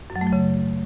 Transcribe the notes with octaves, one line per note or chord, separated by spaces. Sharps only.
F#2
F#3
A3
F#3
C#3